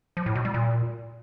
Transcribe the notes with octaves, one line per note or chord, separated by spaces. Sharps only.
F3
A2
B2
G3
A#2